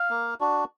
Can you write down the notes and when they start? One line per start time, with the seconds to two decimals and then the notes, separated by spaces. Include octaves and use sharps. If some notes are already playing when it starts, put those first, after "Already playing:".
Already playing: F5
0.10 A#3
0.41 D4 F#4